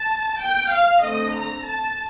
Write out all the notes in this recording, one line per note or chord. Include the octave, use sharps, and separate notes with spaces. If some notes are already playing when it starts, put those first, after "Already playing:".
Already playing: A5
G5
F5
D3 A3 C4 D#5
A#5
A5